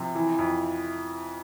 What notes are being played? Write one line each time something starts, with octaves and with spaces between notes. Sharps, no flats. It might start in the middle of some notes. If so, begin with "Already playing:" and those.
Already playing: C3 F3
E3
F2